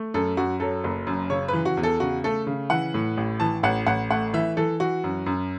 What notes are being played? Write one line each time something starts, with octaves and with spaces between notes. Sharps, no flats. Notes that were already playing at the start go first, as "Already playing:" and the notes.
Already playing: A3
F#2 A4
F#2 F#4
F#3 A4
F#1
F#2
C#3 C#5
E3 B4
F#4
E2
A4
C#3 F#4
A3 A4
C#3
E3 F#5
A2
A1
E3 A5
A1 F#5
A1 F#5
A3 F#5
E3 E5
E3 A4
E3 F#4
F#2
F#2